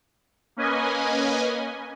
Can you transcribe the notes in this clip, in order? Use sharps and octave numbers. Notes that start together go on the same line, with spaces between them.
A#3 C#4 B4 D#5 G#5